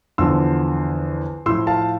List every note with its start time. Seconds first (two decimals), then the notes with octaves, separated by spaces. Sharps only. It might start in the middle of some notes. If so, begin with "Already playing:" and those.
0.18 E2 D3 F3 C6 E6
1.46 A2 F3 C6 E6
1.67 F5 A5